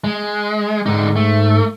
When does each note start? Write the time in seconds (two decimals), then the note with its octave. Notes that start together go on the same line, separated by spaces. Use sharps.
0.04 G#3
0.86 G#2 D3 D#4
1.16 A3